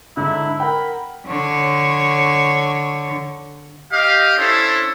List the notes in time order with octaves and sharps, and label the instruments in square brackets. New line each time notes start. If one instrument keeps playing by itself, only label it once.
[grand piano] G#2 D3 [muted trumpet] E4
[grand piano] A#4 F#5 G5 [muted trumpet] B5
[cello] D3 C#5
[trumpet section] G4 D#5 F5
C#4 D4 E4 A4 C5 C#5